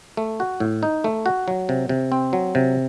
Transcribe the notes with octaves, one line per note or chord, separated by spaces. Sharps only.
A3
F#4
A2
D#4
A3
F#4
F#3
C3
C3
C4
F#3
C3